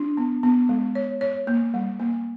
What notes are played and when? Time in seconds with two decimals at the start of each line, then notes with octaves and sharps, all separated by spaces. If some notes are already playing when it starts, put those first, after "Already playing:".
Already playing: D4
0.17 B3
0.43 B3
0.69 G#3
0.95 C#5
1.21 C#5
1.47 A#3
1.74 G3
2.00 A#3